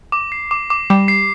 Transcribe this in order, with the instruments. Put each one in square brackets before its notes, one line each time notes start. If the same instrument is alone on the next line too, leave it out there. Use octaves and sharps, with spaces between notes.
[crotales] D6
C7
D6
D6
[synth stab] G3 [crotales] D6
[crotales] C7